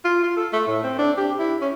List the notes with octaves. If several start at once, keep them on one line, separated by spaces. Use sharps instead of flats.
F4
F4
A4
A3
A2
C4
D4
G4
E4
C#4